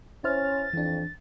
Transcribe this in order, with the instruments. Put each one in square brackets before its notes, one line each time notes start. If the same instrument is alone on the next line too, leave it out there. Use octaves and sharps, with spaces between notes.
[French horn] C#4 [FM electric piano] E4 C5 F6 [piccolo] A6
[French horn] F2 [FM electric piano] E3 D4